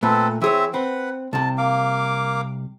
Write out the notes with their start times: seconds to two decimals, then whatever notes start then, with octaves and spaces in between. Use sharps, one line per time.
0.03 A#2 A3 C4 A4 B4
0.41 E3 C4 G#4 C#5 E5
0.74 C4 B4 F#5
1.33 C2 C3 A5
1.58 A#3 F5 D6